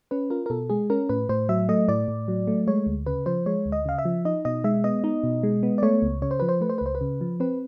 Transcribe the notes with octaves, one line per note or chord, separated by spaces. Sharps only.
C#4 B4
F4 A#4
A#4
B2 A4
G#3 G#4
C#4 A#4
A2 B4
A2 C5
F#3 E5
A3 D#5
A2 D5
A2
F#3
A3
G#3 C#5
D2
C#3 B4
F3 C5
G#3 C#5
D2
D#5
C#3 F5
E5
F3
D#4 D#5
B2 D#5
G#3 E5
B3 D#5
D#4
B2
G#3
B3
D5
A3 C#5
C#2
C#3 C#5
C5
F3 B4
C5
A3 B4
C5
B4
C#2 C5
B4
C#3
F3
C4 B4